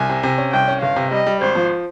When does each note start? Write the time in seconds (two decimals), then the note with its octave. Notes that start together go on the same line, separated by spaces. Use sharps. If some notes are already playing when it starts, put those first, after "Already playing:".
Already playing: C2 G#5
0.09 C3
0.23 C3
0.38 C#4
0.53 C2 G5
0.68 C#4
0.82 G1 F5
0.96 C3
1.11 G3 D#5
1.27 G3
1.41 G#1 C5
1.55 F3